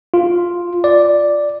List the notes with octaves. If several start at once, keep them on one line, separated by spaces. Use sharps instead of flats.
F4
D5